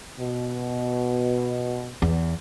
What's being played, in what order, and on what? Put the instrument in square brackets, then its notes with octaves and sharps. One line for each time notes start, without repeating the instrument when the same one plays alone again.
[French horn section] B2
[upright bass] E2